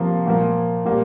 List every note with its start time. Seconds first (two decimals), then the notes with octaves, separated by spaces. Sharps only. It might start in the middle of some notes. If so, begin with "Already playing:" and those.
Already playing: C3 F3 A#3 F4
0.26 A#2 F3 A#3
0.85 A#2 G3 A#3